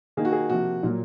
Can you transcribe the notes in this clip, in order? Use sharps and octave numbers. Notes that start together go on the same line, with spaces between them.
D#3 A#3 D#4 G#4
F#4
G#4
C3 F3 A#3 F#4
A#2 F#3 A#3